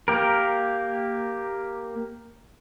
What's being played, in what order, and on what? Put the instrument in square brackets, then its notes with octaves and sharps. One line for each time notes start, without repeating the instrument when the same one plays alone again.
[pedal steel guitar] A#3 G4 A#4